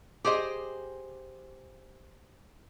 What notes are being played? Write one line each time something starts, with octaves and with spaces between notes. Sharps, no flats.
G4 G#4 C5 D#5